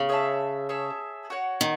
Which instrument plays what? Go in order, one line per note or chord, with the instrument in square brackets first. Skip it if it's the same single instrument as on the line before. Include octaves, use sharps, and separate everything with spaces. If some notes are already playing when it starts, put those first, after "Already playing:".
Already playing: [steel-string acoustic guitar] C#3
[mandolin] G#4 C#5 E5 A5
G#4 C#5 E5 A5
F#4 C#5 F#5
[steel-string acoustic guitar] D#3